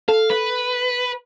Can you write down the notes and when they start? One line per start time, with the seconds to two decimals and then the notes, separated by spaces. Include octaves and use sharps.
0.09 A4 F5
0.30 B4